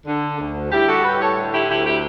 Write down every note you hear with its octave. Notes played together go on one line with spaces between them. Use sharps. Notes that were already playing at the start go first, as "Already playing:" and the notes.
D3
D2
G3 E4 G4
F#4 A4
A2 G4 B4
A4 C#5
D3
E4 G4
D2 E4 G4
E4 G4